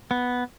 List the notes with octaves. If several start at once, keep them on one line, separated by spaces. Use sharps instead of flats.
B3